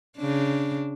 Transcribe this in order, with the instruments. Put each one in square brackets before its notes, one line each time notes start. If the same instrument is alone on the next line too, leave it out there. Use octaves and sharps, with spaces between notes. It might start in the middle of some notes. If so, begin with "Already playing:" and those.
[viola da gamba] C#3 D4